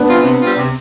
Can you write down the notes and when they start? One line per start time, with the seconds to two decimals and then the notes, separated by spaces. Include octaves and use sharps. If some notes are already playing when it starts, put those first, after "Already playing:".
Already playing: B3 D4
0.09 E3 G3 C4 F4
0.24 C3
0.41 G3 C4 F4
0.57 C3